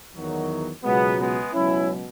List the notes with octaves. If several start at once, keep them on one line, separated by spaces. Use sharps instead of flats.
E2 D#3 F#3
C#2 B2 F#3 G#3 B3
G#3 B3
C#2 B2 F#3 C#4 E4